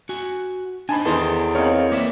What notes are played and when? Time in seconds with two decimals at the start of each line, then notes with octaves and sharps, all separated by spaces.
0.09 F#4 G#5
0.89 D4 D#4 C5 G#5 A5 B5
1.05 E2 D#3 A4 C5 A#5 C6
1.55 C4 D#4 A#4 C#5 F5
1.92 A#3 B4 D5 E5